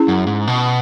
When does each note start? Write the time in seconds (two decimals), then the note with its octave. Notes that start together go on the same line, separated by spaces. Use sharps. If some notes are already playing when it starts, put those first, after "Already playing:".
Already playing: C#4 E4 G#4
0.08 F#2
0.27 G#2
0.47 B2